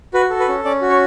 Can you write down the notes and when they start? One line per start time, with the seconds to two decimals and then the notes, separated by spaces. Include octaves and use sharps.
0.14 F#4 B4
0.30 A4
0.40 B4
0.48 C#4
0.64 C#4 D5
0.81 F#4
0.90 C#5